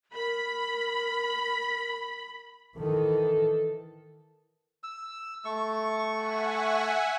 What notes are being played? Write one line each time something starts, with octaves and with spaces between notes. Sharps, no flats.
A#4 B5
D#3 E3 A4
E6
A3 C#6
E5 F#5 G#5